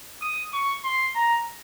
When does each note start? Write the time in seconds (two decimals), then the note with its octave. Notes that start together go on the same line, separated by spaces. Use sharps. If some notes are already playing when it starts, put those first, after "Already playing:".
0.22 D#6
0.53 C#6
0.84 C6
1.15 A#5